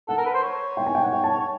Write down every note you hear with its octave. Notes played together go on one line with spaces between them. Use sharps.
A4 F#5
A#4
B4
C5
C#5
G5
G#5
G5
F#5
G5
A5
C#5